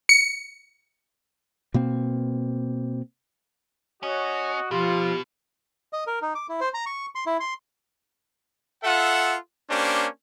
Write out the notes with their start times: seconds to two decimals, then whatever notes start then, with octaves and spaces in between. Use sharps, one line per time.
0.09 C#7
1.74 B2 A#3 C4
4.03 C#4 F#4 C#5 D#5
4.71 B2 F3 F4 G4
5.93 D#5
6.07 A#4
6.22 D#4
6.35 D6
6.49 E4
6.61 C5
6.74 A#5
6.86 C#6
7.15 C6
7.26 E4
7.40 C6
8.84 F4 A4 E5 F#5
9.70 A#3 C#4 D4 G4 C5